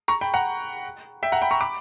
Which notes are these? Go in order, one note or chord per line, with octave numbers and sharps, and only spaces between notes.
A#5 C#6
G5 B5
F#5 A#5
E5 G5
F#5 A#5
G5 B5
A#5 C#6
B5 D6